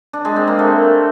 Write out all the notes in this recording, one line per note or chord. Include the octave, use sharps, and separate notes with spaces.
D4
G#3
C4
A#3
A3